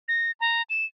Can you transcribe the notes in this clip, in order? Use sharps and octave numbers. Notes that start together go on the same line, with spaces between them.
A#6
A#5
E7